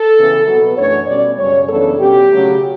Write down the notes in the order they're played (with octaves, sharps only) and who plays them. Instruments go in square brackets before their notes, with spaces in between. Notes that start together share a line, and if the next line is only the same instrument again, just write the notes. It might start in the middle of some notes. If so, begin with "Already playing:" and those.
Already playing: [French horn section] A4
C#3 E3 B3
B2 F#3 B3
F#2 E3 A3 D4 C#5
B2 G3 C#4 D5
F#2 C#3 G3 C#4 C#5
F#2 C#3 E3 B3 D4 A4
B2 G3 C#4 G4
C#3 F#3 A3